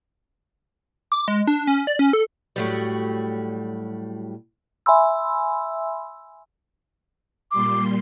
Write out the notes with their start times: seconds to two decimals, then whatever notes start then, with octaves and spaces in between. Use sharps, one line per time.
1.12 D6
1.28 G#3
1.47 D4
1.67 C#4
1.87 D5
1.99 C#4
2.13 A4
2.56 A2 F#3 G3
4.86 E5 G#5 B5 C6 E6
7.51 A#2 G3 C6 D6